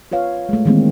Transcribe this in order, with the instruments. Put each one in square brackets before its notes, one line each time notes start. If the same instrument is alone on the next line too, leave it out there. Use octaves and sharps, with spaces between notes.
[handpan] F4 B4 C#5 F5
G#3 A3
D#3 E3 G#3 A#3 C4